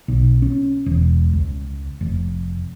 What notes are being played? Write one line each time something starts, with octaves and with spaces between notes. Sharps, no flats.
B1
C#4
E1
C#2
F1